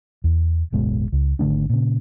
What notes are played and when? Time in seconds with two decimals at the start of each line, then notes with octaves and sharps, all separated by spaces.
0.24 E2
0.72 D1 G1 B2 G#3
1.12 C#2
1.39 G#1 D3 A3 D4
1.69 A#2 C#3